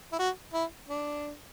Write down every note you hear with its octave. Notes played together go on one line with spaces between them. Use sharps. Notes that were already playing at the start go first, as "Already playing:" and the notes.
E4
F#4
E4
D4